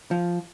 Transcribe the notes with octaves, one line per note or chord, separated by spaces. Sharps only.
F3